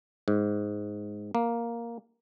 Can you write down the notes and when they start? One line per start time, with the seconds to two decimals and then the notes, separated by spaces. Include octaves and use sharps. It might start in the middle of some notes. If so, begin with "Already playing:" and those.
0.28 G#2
1.35 A#3